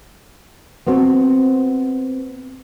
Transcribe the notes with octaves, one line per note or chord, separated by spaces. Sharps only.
B3 C4 F#4